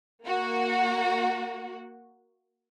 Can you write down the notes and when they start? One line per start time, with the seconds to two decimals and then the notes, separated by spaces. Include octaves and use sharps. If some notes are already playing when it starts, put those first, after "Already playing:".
0.25 A#3 F#4